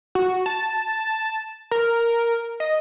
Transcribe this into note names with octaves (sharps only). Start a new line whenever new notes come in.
F#4
A5
A#4
D#5